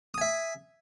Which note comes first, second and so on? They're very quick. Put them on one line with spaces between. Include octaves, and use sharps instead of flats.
D#6 G#5 E5